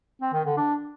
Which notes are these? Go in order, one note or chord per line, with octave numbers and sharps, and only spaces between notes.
C4
D#3
D3
D4